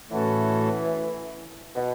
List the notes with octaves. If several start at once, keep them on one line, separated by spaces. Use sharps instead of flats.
A2 E3 A3 C#4 F#4 A4
B2